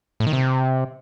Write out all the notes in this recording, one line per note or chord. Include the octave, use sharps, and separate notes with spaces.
A2
D#3
C3